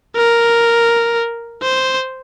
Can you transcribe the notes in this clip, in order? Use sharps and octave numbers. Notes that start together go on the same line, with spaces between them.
A#4
C5